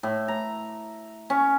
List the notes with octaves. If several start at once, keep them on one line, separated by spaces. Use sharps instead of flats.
A2
A#5
C#4